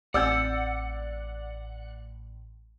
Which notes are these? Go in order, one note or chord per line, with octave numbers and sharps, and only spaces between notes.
A1 C4 G4 D5 F#5 E6 G6